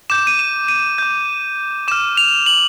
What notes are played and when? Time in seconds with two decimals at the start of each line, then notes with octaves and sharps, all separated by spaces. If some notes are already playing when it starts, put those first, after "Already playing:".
0.10 D6 G6 E7
0.27 D#7
0.39 E7
0.68 D#7
0.98 D6 G6
1.88 D6 F6 E7
2.17 F7
2.46 F#7